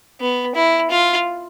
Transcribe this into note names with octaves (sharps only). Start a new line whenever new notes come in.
B3
E4
F4